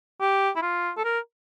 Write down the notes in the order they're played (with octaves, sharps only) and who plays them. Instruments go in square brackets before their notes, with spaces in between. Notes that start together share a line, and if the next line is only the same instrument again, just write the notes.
[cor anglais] G4
E4
F4
A4
A#4